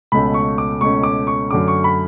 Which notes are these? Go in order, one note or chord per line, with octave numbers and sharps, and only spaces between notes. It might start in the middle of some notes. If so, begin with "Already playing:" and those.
C#2 B2 A3 C#4 B5
C#6
D6
C#2 B2 A3 C#4 C#6
D6
C#6
F#2 D3 A3 C#4 D6
C#6
B5